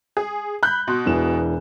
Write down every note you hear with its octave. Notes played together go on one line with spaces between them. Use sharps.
G#4
B5 F#6 G6
B2 C6
E1 E3 E7